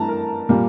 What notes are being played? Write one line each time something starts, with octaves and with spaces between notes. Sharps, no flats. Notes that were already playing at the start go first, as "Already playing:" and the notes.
Already playing: G2 E3 A3 A5 A#5
A#4
A#2 G3 A#3